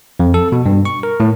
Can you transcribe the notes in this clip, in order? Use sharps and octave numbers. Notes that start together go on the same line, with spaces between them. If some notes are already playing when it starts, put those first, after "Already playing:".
F2
A4
B2
G2
C#6
A#4
A2